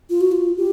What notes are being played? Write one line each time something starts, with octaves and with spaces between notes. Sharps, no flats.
F4
F#4
F4
G4